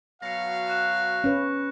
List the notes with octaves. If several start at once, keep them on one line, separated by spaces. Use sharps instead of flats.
B2 F#3 F5 A#6 C#7
C#6 F#6 E7
C#4 B4